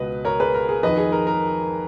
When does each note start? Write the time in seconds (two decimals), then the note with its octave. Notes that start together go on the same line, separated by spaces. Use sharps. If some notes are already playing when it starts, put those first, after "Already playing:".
Already playing: C#2 B2 B4 D#5
0.25 A#4 C#5
0.39 G#4 B4
0.54 A#4
0.69 G#4
0.83 F2 D#3 B4 D#5
0.97 G#4
1.12 A#4
1.27 A#4